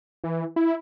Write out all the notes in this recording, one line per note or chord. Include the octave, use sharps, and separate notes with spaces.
E3
E4